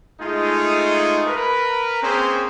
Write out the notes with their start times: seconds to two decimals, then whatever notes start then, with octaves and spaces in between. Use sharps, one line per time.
0.21 G#3 A3 D#4 F4 G#4
1.27 A#4 B4
2.03 A#3 C4 C#4 G#4 C5